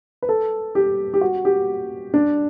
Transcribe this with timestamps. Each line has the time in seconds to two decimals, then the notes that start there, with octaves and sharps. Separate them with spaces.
0.22 B4
0.29 A4
0.75 G4
1.14 G4
1.21 F#4
1.45 G4
2.14 D4